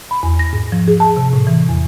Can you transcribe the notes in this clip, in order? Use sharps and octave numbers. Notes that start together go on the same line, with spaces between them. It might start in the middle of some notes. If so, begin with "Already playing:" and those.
B5
E2
A#6
G#2
F3
G#4
A5
C3
A2
E3
E2